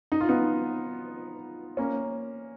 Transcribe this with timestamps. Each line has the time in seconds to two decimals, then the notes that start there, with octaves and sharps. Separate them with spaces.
0.12 D#4
0.20 F4
0.29 B3 D#4
1.77 A#3 C#4